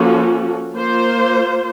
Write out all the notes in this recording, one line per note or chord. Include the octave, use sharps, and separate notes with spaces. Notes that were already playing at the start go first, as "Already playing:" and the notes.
Already playing: F3 A#3 C#4 F#4 A4
A#3 F4 C5